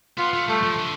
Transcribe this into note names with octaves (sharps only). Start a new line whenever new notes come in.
B3 F4
A3
G3 A3
F3
D3